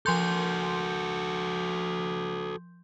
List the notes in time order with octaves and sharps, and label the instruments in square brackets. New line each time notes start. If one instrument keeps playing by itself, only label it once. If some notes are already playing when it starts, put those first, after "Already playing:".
[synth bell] F3 C6 G6 [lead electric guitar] F#4 A4